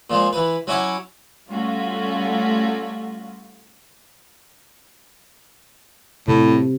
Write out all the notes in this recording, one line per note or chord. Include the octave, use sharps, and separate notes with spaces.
A#2 F3 G#3
E3 B4
F#3 C#4 E4 C#5 F#5 D6
G3 A3 C#4 F4 F#4
A2 C3